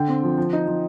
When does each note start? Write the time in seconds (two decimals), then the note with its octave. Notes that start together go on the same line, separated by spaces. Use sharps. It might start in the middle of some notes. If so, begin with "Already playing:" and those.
Already playing: D3 G5
0.08 C4
0.23 F3
0.38 F3
0.53 D#4
0.68 F3